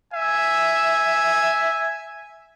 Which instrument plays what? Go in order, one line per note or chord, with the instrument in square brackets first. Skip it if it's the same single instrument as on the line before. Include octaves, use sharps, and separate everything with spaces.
[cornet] E5 [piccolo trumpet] G#5